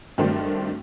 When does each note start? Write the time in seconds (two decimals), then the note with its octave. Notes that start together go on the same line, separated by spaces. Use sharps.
0.18 G2 D#3 F#3 A3 C4 D4